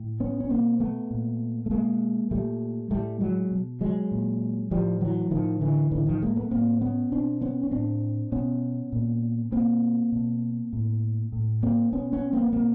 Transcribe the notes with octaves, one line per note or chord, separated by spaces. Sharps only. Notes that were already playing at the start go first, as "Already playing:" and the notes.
Already playing: A2
B3 C#4
C#4
B2 A#3 C4
A3 B3
A#2
A3
B2 G#3 A#3
A#2 G3 A3
A2 G3 A3
F#3 G#3
B2
F#3 G#3
A#2
A2 F3 G3
E3 F#3
A2 D#3 F3
D3 E3
A2 D3 E3
D#3 F3
G#3 A#3
A3 B3
A2 A#3 C4
B3 C#4
B2 C4 D4
B3 C#4
C#4
A2 C4 D4
B2 B3 C#4
A#2
B2 A#3 C4
B2
A2
A2
A#3 C4
B2 B3 C#4
B3 C#4
A#3 C4
B3
B2 A#3 C4